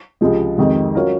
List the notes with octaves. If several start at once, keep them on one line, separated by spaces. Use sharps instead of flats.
C#2 C3 F3 G#3
F2 C3 D#3 G#3
F#3 C#4 F4 A#4